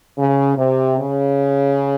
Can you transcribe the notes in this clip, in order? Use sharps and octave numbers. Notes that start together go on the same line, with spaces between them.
C#3
C3
C#3